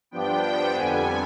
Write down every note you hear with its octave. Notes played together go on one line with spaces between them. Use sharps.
G2 F3 B3 D4 G5
G5
F2 D3 G3 B3 G#5